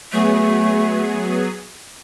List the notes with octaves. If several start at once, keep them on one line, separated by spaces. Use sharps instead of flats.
F#3 A3 B3 G#4